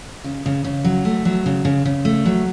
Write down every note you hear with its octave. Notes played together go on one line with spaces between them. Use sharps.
C#3
C#3
C#3
F#3
A3
F#3
C#3
C#3
C#3
A3
F#3